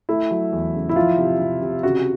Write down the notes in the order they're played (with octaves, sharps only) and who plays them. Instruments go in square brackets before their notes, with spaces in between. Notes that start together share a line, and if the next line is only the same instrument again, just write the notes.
[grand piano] A3 [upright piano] E4
[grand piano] F#3
E2
C#3
[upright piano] E4
[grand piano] F3 [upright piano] F4
[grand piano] C3
C3
C3
[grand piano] C#3 [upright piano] F#4